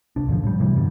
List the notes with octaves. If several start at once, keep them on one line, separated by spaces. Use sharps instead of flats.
C2 D4
A2 D3 E3 F3
A2 G3
C3 E3 F#3 G3
G2 D3 G3